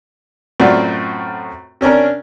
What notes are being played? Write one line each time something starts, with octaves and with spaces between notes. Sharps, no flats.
F#2 A2 C4 F4 F#4 D5
C3 C#4 D4 A#4